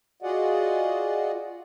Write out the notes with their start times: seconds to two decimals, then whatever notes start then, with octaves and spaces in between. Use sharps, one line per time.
0.22 F4 F#4 G#4 D5 D#5 F#5